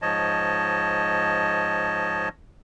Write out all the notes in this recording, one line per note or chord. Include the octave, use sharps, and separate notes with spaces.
G#2 F3 C#5 D#5 A5